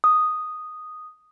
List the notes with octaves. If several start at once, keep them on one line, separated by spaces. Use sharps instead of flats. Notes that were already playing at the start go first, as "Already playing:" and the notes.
D#6